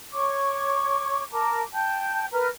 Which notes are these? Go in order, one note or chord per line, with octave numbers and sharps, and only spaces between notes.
C#5 C#6 D6
A#4 A5 A#5 D6
G5 A5 G6
A#4 B4 A#5 F6